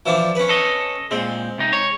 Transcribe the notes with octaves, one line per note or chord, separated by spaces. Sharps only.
E3 F3 D4
C#4 B4
A4 D#5
A#2 G#3 C4
C3 D#4
C#5